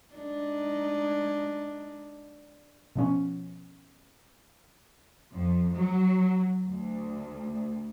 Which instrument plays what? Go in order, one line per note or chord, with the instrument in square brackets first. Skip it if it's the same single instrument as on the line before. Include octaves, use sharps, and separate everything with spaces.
[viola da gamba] G#3 D4 D#4
[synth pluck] B2 F3 C#4
[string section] F2
F#3
D2